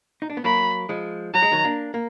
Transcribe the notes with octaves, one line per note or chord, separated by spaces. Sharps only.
D#4
D4
B3
F#3 A#3 B5
F3 G#3
F#3 A#5
G#3
D#3 F#3
A#3 D4
A#3